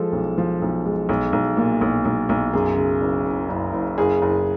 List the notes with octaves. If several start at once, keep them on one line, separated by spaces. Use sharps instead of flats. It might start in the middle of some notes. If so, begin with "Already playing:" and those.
Already playing: F3 G#3 A4
B1
F3
B1
G#3
B1
B1
A#2
B1
B1
B1
F#2 G#4
C#3
F#1
F#1
F#1
F#1
F#1 G#4
F#1